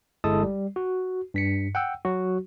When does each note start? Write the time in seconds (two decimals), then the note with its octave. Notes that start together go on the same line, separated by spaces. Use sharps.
0.24 G1 G#3 E4 A4 A5 D#6
0.43 G3
0.76 F#4
1.34 G2 B6 C#7
1.75 F#5 G5 E6
2.05 F#3 F#4